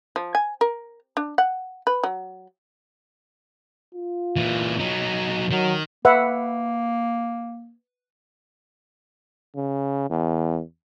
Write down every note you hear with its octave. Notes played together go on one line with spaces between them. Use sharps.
F3
G#5
A#4
D4
F#5
B4
F#3
F4
A#2 E3
F#3 D#4
D#3 F#3
A#3 B4 E5 F#5
C#3
E2